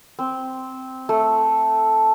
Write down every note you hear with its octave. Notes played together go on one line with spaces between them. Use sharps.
C4
A3